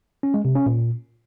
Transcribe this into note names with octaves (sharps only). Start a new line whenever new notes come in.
C#4
G#3
C3
C#4
A#2